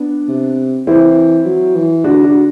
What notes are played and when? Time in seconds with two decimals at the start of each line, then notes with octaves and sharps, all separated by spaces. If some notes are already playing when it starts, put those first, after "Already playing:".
Already playing: B3 D4
0.28 C3
0.87 E3 C4 E4
1.45 F#3
1.75 E3
2.04 D3 D4 F#4
2.24 D4 F#4